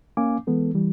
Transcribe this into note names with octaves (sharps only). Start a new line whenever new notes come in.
A#3 C#4 F5 G#5 D6
E3 G#3 B3 A4
E3 G3